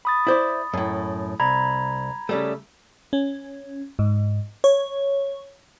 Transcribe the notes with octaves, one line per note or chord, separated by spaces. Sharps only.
B5 D#6 A6
E4 C5 D5
F#2 A2
C2 A#5 B5 G#6
C#3 G3 A3
C#4
G#2
C#5